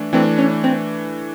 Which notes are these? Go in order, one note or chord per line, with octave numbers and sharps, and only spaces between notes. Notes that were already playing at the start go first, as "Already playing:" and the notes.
Already playing: E3 A3 D4
E3 A3 C4 D4
C#4
C4